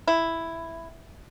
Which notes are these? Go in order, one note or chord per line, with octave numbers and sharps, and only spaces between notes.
E4